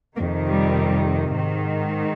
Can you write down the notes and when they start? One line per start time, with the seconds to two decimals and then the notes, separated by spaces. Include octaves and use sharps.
0.16 F2 C3 D#3 A#3
0.47 G3
1.34 G#2 D#3